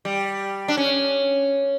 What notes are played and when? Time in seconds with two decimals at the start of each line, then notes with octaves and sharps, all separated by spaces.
0.05 G3
0.68 D4
0.77 C#4